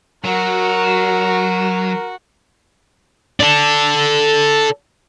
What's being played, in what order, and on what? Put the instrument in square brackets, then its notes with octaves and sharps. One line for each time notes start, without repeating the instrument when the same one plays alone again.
[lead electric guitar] F#3 [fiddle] F#4 [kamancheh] A#4
[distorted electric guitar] A4 D5